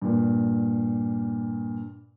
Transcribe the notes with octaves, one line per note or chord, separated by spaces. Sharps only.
G2 A#2